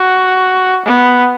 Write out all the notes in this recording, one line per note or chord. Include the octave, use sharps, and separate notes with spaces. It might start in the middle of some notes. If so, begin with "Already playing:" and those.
Already playing: F#4
B3